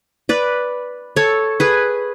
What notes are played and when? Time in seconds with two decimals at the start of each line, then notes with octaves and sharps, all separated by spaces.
0.29 B4 D5
1.16 A4 C#5
1.60 G#4 B4